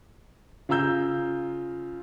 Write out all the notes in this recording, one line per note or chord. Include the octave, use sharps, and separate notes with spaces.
C#3 F4 A#5 E6 G6